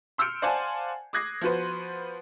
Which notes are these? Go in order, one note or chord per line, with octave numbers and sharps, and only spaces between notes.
C6 E6 F6 G6 C#7 D7
C5 D5 F5 F#5 G#5 A5
D6 D#6 F#6 G#6 A#6 C7
F3 B3 F#4 B4 C5